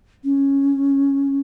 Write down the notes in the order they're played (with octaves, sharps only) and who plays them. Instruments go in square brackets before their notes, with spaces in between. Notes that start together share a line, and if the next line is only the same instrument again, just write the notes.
[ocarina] C#4